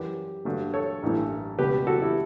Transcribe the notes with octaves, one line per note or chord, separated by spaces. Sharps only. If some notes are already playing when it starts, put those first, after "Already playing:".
Already playing: F#2 E3 G3 G4 B4
G2 D3 F#3 A3
A4 C#5
A1 G2 E3 A3
C#2 B2 G3 G4 B4
F#4 A4
E4 G4